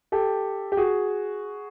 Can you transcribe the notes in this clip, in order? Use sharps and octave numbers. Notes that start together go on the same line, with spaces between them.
G4 A4
G4
F#4 G#4